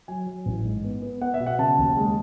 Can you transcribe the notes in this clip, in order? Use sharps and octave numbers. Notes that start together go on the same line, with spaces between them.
F#3 G#5
F#3
A1
G#2
B3
B3
B3 F#5
E5
B2
F#5
C#3 A5
D#2
G#3